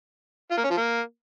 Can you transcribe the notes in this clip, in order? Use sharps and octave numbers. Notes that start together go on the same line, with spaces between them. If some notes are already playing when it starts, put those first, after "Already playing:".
F4
A#3
C#4
F3
A#3